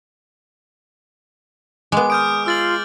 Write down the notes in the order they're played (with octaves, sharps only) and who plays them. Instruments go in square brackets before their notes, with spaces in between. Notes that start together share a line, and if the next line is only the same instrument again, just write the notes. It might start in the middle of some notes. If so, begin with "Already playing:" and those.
[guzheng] G#3 B3 [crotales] D6
[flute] D#6 [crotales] F6 G6 D7
[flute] F4 [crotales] E6 A6 F#7